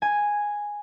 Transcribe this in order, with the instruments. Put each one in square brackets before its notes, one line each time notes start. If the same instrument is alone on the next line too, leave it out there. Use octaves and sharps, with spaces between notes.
[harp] G#5